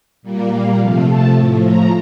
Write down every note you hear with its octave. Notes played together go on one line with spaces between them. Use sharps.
A#2 G3 A#3
F5
C3 F3 A3 F5
A5
A2 F3 A3
A#5